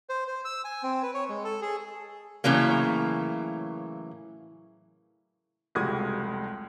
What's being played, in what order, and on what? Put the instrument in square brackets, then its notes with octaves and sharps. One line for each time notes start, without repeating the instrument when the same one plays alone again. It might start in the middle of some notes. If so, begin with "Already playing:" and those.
[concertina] C5
C5
E6
G#5
C4
B4
C#5
G#3
A4
G#4
[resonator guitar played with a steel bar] A2 C#3 E3 F#3 A#3
[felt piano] F1 C#2 G3 F#4 D#6 G#6